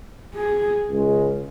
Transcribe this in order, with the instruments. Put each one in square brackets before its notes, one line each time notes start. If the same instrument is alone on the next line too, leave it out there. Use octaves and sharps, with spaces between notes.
[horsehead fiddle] G#4
[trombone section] C#2 C#3 G#3